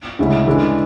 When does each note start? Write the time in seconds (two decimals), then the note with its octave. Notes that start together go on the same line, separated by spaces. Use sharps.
0.19 D2 C#3 G#3 C#4 E4
0.47 E3 G#3 D4 A4